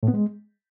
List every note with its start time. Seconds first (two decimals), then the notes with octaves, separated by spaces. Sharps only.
0.03 A2
0.08 B3
0.14 G#3